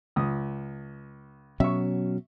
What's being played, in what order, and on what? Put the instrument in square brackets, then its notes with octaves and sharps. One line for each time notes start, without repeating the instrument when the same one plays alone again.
[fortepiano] C#2 D#6
[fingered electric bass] B2 F#3 C#4 [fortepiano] E5 C#6